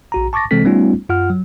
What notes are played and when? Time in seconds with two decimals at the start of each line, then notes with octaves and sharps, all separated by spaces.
0.12 A#1 F#4 A#5
0.33 A5 C#6 D6 A6 A#6
0.51 C3 E3 G#3 C4 A4 B6
0.65 G3 A3 B3 C#4 D#4 F4
1.09 F#2 F4 F#5 F6
1.30 F#3